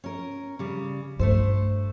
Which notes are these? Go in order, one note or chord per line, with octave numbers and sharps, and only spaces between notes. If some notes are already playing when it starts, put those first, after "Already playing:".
C#4 A#4
C#3 G3
G2 A3 A4 C5